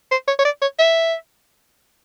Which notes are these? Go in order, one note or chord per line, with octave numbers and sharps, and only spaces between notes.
C5
C#5
C#5
D5
C#5
E5